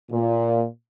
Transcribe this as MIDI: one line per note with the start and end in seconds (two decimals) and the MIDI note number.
0.11 0.64 46